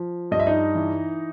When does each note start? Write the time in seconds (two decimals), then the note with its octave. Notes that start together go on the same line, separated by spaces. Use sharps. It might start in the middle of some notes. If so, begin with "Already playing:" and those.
Already playing: F3
0.31 G2 D#5
0.40 E5
0.47 D#4 D#5
0.75 E3